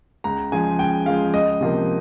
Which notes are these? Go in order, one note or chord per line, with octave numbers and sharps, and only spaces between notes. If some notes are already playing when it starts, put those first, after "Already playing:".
C#2 A#5
C#3 F3 G#3 G#5
C#2 G5
C#3 F3 G#3 F5
C#2 D#5
C3 F3 A#3